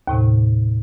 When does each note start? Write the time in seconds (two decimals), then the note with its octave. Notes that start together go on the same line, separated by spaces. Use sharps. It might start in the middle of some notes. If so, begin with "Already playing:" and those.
0.08 D#2 A2 C3